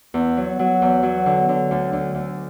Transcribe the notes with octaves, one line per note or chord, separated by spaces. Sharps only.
E2
F#3
F#3
E2
F#3
D3
D3
D2
D2
D2